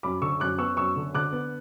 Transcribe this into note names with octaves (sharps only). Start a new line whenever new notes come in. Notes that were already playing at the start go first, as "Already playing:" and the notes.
F#2 B5 D6
D3 C#6 E6
F#2 D6 F#6
B3 C#6 E6
F#2 C#6 E6
D3
D3 D6 F#6
B3